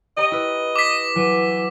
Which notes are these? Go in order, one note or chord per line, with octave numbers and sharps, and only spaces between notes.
G4 C#5 D#5 A#5
E4 B4
D6 B6
E3 F#3